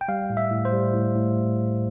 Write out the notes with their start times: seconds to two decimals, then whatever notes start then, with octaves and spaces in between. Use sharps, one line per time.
0.01 G5
0.08 G3 F5
0.30 A2
0.37 E5
0.51 A2
0.65 C5
0.73 G3
0.93 A2
1.16 A2